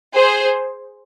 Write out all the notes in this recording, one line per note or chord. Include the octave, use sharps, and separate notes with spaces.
G#4 C5